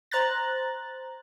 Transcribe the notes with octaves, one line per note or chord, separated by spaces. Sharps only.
C5 A#5 F#6 A6